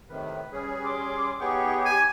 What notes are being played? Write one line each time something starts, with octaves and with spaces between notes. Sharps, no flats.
A2 C3 D#3 B4
G3 C#4 G#4
C6 D6
B3 D#4 G4 G#4 C#5 G5 C#6
G#5